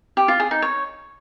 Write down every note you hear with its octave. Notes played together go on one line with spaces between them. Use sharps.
G4
F4
G#4
D#4
C#5